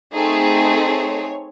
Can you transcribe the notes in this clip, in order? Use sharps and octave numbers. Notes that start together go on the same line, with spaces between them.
A3 C4 D#4 G#4
C#5